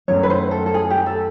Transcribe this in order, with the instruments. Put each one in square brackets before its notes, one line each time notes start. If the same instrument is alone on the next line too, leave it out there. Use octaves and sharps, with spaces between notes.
[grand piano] F#2 D#3 F#3 A3 [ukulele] C#5
[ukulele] B4
C5
A4
A4
G#4
G4
A4